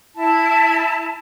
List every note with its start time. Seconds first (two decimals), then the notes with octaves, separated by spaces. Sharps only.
0.16 E4 A5